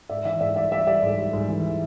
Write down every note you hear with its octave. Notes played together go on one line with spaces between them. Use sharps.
G#2 D5 E5
E3 D5 E5
G#2 D5 E5
G3 D5 E5
G3 D5 E5
G3 D5 E5
G#2
G3
G#2
E3